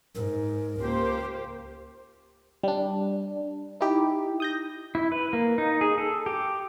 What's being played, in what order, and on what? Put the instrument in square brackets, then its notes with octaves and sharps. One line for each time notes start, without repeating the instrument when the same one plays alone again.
[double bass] G#2 [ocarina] A#4
[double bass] C#2 [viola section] A#3 G4 C5
[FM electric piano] G3 D4
D#4 E4 G4
D#6 G6 A#6
[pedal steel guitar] E4
B4
A#3
D#4
G#4
A4
G4